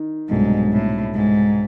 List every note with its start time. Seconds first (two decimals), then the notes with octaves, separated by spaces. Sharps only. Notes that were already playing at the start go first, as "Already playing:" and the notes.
Already playing: D#3
0.30 C2 G#2 B2 F#3 A3 D4
0.73 A2
1.14 G#2